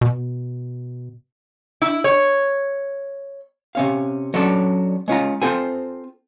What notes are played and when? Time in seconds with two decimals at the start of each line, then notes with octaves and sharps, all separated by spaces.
0.01 B2
1.82 E4
2.04 C#5
3.75 C3 C#4 F5
4.34 F#3 C#4 D4 A4 D5
5.08 G#3 C#4 F4 A#5
5.42 C4 F4 A4 C5 G#5